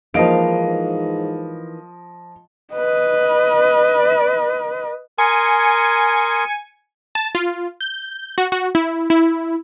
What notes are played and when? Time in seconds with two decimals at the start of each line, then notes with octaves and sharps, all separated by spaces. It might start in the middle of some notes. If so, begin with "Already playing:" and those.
0.14 G#2 E3 F3 A#3 D#4 D#5 F5 D7
2.74 B4 D#5
5.18 A#4 G#5 C6 D#6 C#7
7.15 A5
7.35 F4
7.81 G6
8.38 F#4
8.52 F#4
8.75 E4
9.10 E4